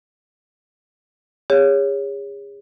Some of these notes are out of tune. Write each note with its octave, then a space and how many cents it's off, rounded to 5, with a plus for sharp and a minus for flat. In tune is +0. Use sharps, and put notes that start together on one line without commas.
G#4 -40 C#5 +0